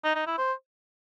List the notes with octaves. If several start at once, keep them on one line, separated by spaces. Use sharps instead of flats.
D#4
D#4
E4
C5